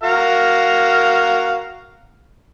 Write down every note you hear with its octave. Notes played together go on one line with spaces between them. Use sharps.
F#4 A#4 F5